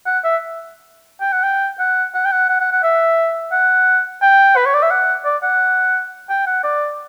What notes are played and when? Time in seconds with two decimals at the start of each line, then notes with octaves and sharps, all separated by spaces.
0.06 F#5
0.24 E5
1.21 G5
1.32 F#5
1.43 G5
1.80 F#5
2.15 F#5
2.25 G5
2.32 F#5
2.49 F#5
2.60 F#5
2.72 F#5
2.83 E5
3.52 F#5
4.22 G5
4.57 B4
4.66 C#5
4.74 D5
4.83 E5
4.91 F#5
5.25 D5
5.43 F#5
6.30 G5
6.47 F#5
6.64 D5